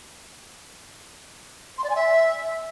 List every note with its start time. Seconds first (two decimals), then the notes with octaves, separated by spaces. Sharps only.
1.78 C6
1.84 D5
1.90 G#5
1.96 E5